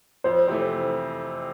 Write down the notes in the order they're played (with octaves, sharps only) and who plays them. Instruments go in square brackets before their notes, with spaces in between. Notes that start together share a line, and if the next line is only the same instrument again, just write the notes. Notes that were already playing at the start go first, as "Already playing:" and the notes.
[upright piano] F2 [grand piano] C5
[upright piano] C3 E3 A3 [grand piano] C5